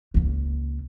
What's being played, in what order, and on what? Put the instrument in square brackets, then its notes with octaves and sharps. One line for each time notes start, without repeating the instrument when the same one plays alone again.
[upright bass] C#2 A#3